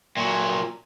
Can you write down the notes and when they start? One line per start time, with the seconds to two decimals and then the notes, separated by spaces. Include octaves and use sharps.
0.17 A#2 F#3